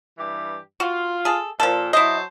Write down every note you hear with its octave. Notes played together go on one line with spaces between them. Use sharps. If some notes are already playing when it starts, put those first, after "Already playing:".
G2 E3 G4
F4 F#4
G#4 A4
A#2 F3 A4
F#3 E4 C5 D#5 A5